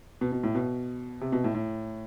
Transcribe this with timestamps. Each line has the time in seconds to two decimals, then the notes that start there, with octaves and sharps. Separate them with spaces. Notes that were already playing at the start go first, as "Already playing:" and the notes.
0.21 B2
0.32 B2
0.43 A2
0.55 B2
1.21 C3
1.32 B2
1.44 A2
1.55 A2